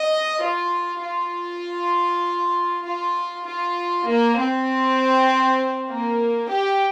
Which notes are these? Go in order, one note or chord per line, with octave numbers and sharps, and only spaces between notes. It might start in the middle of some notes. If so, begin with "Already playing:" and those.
Already playing: D#5
F4
F4
F4
F4
A#3
C4
A#3
G4